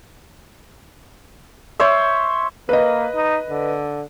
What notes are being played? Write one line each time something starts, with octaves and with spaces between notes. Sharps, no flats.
C5 C#5 E5
A#3 B4 D#5
D#4
D3